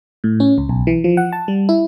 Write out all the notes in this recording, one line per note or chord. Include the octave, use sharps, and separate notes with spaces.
A2
C#4
C#2
B1
E3
F3
F#5
A5
G3
E4